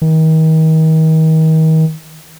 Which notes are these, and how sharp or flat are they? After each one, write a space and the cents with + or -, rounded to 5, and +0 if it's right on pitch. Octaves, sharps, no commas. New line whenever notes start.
D#3 +35